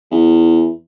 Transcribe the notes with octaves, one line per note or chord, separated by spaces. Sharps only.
E2